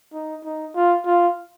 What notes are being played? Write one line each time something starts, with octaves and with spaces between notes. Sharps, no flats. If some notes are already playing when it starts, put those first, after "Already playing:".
D#4
D#4
F4
F4